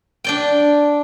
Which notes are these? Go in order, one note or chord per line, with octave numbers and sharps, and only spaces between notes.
D4 D5 G5